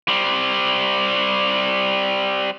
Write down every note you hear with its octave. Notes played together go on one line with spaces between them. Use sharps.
G3 C4